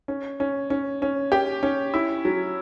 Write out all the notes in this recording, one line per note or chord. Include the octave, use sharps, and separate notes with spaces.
C#4
C#4
C#4
C#4
G4
C#4
E4
F#3